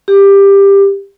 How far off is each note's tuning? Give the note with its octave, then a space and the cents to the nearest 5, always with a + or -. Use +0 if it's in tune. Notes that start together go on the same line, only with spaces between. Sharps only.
G4 +15